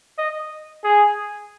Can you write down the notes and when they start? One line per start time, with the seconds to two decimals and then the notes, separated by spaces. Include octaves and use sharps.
0.18 D#5
0.84 G#4